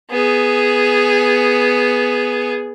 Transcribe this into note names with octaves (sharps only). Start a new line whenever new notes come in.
B3 G#4